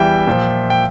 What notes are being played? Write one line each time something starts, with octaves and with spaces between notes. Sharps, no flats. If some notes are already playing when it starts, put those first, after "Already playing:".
Already playing: E2 E3 G3 E5 G5
A#2 F3
G5